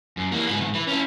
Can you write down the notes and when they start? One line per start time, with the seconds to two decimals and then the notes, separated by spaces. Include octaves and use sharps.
0.17 F#2
0.32 E3 A#3
0.47 G#2 B3
0.61 G#2 D#3
0.74 E3 B4
0.87 C#4 E4